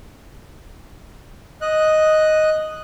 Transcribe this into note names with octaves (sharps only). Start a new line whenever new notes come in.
D#5 F#6